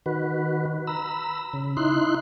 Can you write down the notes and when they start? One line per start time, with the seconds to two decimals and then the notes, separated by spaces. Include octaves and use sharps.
0.06 D#3 F#4 B4
0.87 A#5 B5 E6
1.53 C#3
1.77 D#4 E4 C6 F#6